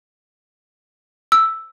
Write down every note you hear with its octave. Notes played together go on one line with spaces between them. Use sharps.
E6